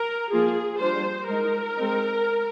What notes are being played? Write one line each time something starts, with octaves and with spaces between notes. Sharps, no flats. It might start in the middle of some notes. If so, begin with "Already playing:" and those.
Already playing: A#4
F3 A#3 F4 G#4
G3 D4 F4 C5
G#3 D#4 A#4
G#3 C4 D#4